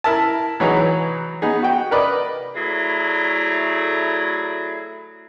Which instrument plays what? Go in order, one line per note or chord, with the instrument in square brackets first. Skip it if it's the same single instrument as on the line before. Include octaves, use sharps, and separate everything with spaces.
[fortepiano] E4 A#4 E5 A5
E3 F#3 D#4 G#4 B4
B3 D#4 G#4
F#4 G5
A#4 B4 D5 D#5
[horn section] F#3 A3 E4 G#4 D5 A#5